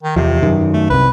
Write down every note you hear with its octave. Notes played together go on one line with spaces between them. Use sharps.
D#3
E2 C3 F3
F#2 D#3
A3
C2 C3 B4